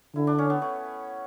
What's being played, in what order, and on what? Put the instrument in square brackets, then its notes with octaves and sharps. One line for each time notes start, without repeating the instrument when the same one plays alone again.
[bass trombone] D3 [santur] E4
[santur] D4
C#4
B3
A3